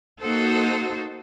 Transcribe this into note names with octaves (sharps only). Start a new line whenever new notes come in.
A#3 D#4 F#4 A4 C5